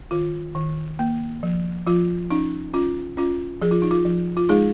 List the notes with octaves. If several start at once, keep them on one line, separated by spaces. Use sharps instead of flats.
D#3 F4
D#3
A#3
F3
F3 F4
C#4 D#4
C#4 F4
C#4 F4
F3 G#4
F4
D#4
F4
F3
F4
G#3 D#4 G#4